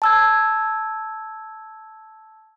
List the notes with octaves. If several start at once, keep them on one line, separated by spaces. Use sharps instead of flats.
A5 E6 G#6